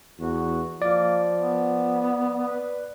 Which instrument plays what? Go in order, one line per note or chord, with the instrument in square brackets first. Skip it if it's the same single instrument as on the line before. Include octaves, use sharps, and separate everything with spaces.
[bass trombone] E2 [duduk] F#4
[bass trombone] F3 [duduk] A#3 [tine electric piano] D5
[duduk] B3
B4